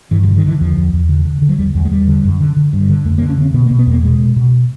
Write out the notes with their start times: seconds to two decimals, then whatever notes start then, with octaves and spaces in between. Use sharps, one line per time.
0.11 G2 E3
0.23 D#3
0.27 D3
0.37 D#3
0.44 D3 E3
0.61 E2 F3
0.77 E2
0.93 E2
1.09 D3
1.25 D3
1.42 D3
1.49 F#3
1.58 E2 G3
1.75 E2 F#3
1.85 G#3
1.91 E2 G3
2.08 D3
2.24 F#2
2.41 D3
2.57 D3
2.73 G2
2.90 D3
3.05 F2 A3
3.18 A#3
3.21 D3
3.30 C#4
3.37 D3 C4
3.54 B2 B3
3.66 A#3
3.71 B2
3.79 B3
3.86 E2 A#3
4.03 B2 G#3
4.19 B2
4.36 B2